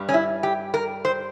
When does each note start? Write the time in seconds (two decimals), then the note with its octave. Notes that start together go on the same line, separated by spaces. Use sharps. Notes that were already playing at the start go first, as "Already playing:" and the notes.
Already playing: G2 G3
0.09 C#4
0.14 E4
0.43 G4
0.74 A#4
1.05 C5